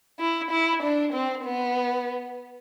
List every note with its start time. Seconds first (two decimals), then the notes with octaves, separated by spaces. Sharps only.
0.19 E4
0.51 E4
0.83 D4
1.13 C4
1.45 B3